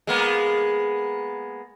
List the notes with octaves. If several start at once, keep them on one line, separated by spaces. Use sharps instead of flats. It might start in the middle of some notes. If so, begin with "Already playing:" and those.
G#3 A#3 B3